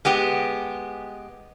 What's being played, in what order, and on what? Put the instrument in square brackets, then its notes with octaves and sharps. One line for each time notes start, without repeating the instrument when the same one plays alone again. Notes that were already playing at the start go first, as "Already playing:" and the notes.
[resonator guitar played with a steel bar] G#3 B3 G4